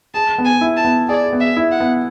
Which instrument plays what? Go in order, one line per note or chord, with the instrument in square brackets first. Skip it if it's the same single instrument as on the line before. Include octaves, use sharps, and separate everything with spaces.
[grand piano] G#4 [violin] A5
[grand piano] B3
[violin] G#5
[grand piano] E4
[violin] A5
[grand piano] B3
[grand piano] G#4 [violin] D5
[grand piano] B3
[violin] E5
[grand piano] E4
[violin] F#5
[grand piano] B3